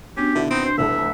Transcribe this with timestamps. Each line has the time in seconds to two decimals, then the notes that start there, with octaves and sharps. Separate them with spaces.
0.17 B3 C#4 D4 F#4 G4
0.35 B2 D3 D#3 E4 E5
0.51 C4 D#4 B5
0.65 D4 C5
0.78 F1 C2 E3 A4 E5